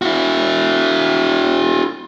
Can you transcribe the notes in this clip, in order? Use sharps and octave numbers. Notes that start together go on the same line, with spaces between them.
E4 F#4